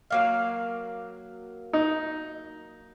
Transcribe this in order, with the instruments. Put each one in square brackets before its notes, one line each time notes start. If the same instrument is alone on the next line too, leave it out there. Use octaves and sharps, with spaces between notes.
[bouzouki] F#3 A#3 F5
[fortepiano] D#4